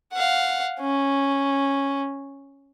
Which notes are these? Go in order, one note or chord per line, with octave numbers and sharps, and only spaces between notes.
F5 F#5
C#4